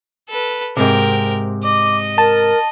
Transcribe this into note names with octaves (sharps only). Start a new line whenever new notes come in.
A4 B4
G#2 C3 A#4 G5
D#5 D6
A#4 A5